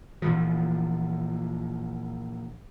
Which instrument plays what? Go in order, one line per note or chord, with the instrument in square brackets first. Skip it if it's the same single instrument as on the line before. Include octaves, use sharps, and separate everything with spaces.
[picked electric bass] A#2 E3 F3